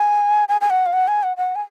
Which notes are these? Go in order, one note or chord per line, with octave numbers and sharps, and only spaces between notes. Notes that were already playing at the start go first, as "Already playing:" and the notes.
Already playing: G#5
G#5
G#5
F#5
F5
F#5
G#5
F#5
F#5
G#5